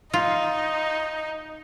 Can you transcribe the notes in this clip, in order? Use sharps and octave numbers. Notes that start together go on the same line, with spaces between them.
D#4 F4